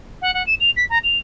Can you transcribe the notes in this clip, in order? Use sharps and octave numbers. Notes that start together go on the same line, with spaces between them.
F#5
F#5
E7
F7
B6
A#5
F7